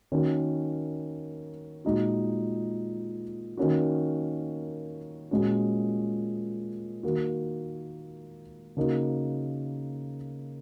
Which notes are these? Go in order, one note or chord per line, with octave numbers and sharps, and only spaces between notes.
D#3 A#3 C#4 F#4
A#2 G#3 D#4 F#4
D#3 A#3 C#4 F#4
A#2 G#3 C#4 F#4
D#3 A#3 F#4
C#3 A#3 D#4 F#4